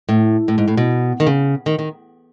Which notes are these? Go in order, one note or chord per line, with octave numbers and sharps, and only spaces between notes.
A2
A2
G#2
A2
B2
D#3
C#3
D#3
D#3